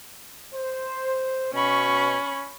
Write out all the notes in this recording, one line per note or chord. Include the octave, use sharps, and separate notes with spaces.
C5
B2 C#4 B5 C#6